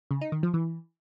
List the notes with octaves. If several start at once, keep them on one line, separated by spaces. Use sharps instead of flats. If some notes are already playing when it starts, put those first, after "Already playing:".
C#3
D#4
D#3
F3
E3